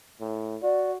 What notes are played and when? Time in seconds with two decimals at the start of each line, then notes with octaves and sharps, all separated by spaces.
0.21 A2
0.63 F#4 D5